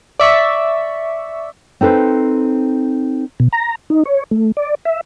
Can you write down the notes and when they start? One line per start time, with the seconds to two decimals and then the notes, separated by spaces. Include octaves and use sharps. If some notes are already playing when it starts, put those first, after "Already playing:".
0.19 D5 E5 C#6 B6
1.81 C4 D#4 A4 B4 C5
3.40 B2
3.53 A#5
3.90 D#4
4.05 C#5
4.31 A3
4.57 D5
4.85 E5